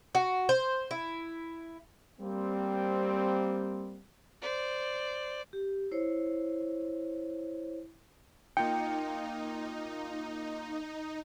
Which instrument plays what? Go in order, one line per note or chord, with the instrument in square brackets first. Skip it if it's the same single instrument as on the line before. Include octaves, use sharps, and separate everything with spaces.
[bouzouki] F#4
C5
E4
[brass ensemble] G3 A#3 C4
[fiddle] C5 D5
[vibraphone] G4
E4 C5 C#5
[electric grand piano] A#3 F4 C#7 [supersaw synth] D#4 [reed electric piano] G5